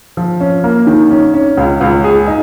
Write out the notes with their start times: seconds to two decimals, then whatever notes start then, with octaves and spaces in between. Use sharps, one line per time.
0.17 F3
0.40 C#4
0.64 A#3
0.87 D#3
1.11 C#4
1.34 C#4
1.57 C#2
1.81 C#2
2.04 G#4
2.28 D#4